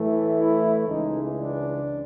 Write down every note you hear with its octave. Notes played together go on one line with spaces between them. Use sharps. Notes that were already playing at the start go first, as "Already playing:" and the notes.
Already playing: A2 E3 A3
E4
C#2 C#3 E3 G#3 D#4
D4